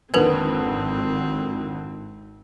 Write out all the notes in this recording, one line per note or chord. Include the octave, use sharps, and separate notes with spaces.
G#1 F2 D3 D#3 C4 A#4 B4 G#6